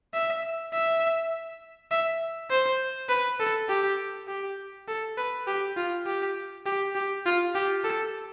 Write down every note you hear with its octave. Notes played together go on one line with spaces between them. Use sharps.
E5
E5
E5
C5
B4
A4
G4
G4
A4
B4
G4
F4
G4
G4
G4
F4
G4
A4